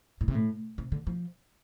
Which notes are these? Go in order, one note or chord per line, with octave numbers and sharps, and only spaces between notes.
A2
C3
A2
C3
D3
F3